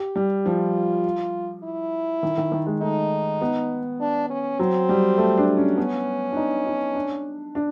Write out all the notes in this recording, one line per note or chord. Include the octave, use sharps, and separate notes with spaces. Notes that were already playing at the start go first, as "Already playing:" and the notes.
Already playing: G4
G3
F3 F4
E4
D#3
D#3
D#3
G#3
A3 D#4
B3
D4
C#4
F#3 C4
G3
A3
D4
C#4
B3 C#4
D4
D#4
D#4
D4
D4